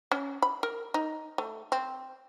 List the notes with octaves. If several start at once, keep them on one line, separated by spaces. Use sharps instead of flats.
C#4
B5
A#4
D#4
A3
C4